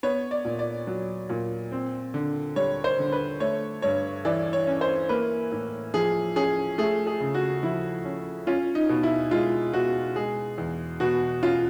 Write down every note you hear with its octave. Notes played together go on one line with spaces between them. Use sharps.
B3 C#5
D5
A#2
D5
F#3
A#2
C4
D3
G3 C#5
C5
D3
B4
A3 C#5
G2 C#5
E3 D5
C#5
C#4
C5
A#3 B4
A2
F3 G#4
C#4 G#4
A3 G#4
G#4
C#3
F#4
F3 E4
C#4
C#4 F4
D#4
B2
E4
G#3 F4
B2 F#4
G#3 G#4
E2
B2 F#4
C#4 F4